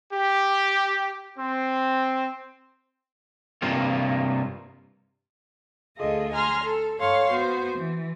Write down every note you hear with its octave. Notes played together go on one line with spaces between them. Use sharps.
G4
C4
G2 C3 A#3 F4
D2 F4 G#4 A4 D#5
G#5 A#5 C6 F6
A4
G2 A4 C#5 F5 C6 C#6
B3 F#4 C5
E3